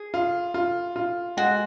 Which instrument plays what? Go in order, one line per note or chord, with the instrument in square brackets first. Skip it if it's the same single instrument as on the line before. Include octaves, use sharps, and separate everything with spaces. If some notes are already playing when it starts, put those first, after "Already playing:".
Already playing: [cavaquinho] G#4
[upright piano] F4
F4
F4
[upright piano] G#3 [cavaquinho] F#4